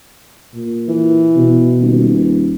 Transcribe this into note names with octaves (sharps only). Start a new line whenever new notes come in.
A#2
E3
B2
D#1